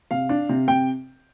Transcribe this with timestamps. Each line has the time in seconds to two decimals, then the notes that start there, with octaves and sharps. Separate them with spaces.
0.11 C3 F5
0.29 D4
0.49 C3
0.68 C3 G5